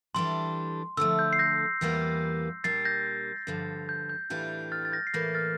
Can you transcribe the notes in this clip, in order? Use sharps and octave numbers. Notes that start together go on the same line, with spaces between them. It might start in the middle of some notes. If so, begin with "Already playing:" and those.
E3 G3 D4 A4 C6
D3 F3 A3 E6
G6
C7
G6 A#6
E2 E3 G3 A#3 F4
A#2 G3 D4 A6 C7
G6 A#6
G2 D3 F3
G6
G6
A2 E3 G3 D4 F4 G6
F6 A6
A6
G6 A#6
C7
A2 E3 A#3 G6 A#6
F6 A6